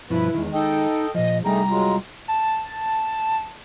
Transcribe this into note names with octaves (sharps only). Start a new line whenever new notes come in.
G2 B2 F3 E4 B4
E2 D#3 G#3
D#4 A4 D#5 G5
A#2 F3 D#5
C2 G3 A3 D#4 G#4 A#5
F#3 G#3 F4
A5